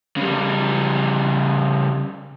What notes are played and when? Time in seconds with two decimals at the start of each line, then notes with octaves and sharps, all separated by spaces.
0.17 C#3 G3